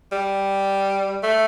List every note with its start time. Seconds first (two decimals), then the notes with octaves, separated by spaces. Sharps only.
0.12 G3
1.23 A3